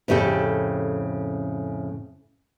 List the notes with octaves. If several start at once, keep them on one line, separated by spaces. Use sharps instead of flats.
F2 A2 C#3 G4 A4